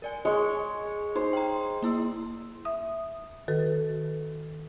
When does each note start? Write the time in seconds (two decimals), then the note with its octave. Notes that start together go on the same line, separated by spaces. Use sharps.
0.02 A#4 D5 G#5
0.25 G#3 C#5 G#5
1.16 D#4 C5
1.33 G5 A#5
1.82 A#3 E4 E6
2.65 E5 D#6
3.48 D#3 F#4 A4 B4